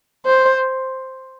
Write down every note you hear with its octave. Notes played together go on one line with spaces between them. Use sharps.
C5